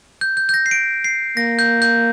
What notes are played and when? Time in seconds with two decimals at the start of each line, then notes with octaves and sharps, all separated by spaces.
0.21 G6
0.37 G6
0.49 G6
0.54 A#6
0.66 C7
0.71 D7
1.04 C7
1.37 A#3 A#6
1.59 G6
1.82 G6